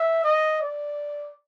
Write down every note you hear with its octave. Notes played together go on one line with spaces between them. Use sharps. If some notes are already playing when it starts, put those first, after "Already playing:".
Already playing: E5
D#5
D5